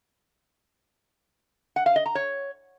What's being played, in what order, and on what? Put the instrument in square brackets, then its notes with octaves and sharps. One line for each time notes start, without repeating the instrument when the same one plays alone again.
[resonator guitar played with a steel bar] F#5
F5
D#5
A#5
C#5